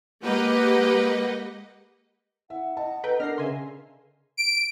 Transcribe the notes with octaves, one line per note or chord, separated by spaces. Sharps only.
G#3 A#3 G4 B4 D#5 F#5
E4 E5 F#5
D#5 A5
A4 B4 G5 A#5
D4 A4 A#4 F6 A#6 C7
C#3 B4 E5 G#5 C6
D7